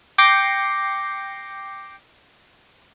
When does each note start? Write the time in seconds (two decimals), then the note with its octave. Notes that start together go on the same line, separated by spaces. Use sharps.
0.18 G5 D6 G6 A#6 C7 C#7